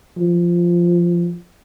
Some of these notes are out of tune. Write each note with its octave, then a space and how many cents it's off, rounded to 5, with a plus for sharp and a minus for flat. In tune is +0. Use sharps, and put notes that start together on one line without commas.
F3 -10